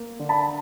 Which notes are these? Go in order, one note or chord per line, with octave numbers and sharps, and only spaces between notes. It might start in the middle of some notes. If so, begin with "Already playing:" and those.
Already playing: A#3
D3
A5 B5